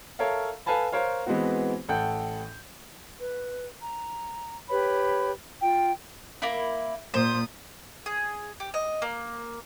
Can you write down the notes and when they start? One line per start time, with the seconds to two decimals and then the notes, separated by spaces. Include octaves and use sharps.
0.19 A4 A#4 C#5 E5 F5
0.66 A4 B4 F5 G#5 A5 B5
0.92 A#4 C5 C#5 F5
1.27 E3 G#3 B3 C4 F#4
1.89 A1 A4 F#5 G5 G6
3.18 B4
3.82 A#5
4.69 G4 B4 C#5 B5
5.61 F4 G5
6.42 A#3 E4
7.14 A#2 C5 D#6
8.06 G#4
8.60 G4
8.74 D#5
9.02 A#3